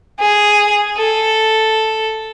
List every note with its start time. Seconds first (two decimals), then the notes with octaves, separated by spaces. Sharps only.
0.20 G#4
0.97 A4